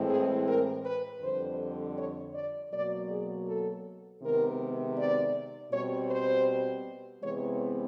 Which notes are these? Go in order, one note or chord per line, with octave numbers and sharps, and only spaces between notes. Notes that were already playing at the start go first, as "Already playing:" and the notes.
Already playing: A2 E3 G#3 C4
G#4
A#4
B4
F2 D3 G3 C5
C#5
D5
B2 F#3 A#3 D5
G#4
A4
C3 D#3 G#3 B3 A#4
D5
B2 G3 C4 C#5
C5
C3 E3 G#3 B3 C#5